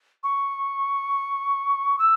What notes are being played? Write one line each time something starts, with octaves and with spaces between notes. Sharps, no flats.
C#6
E6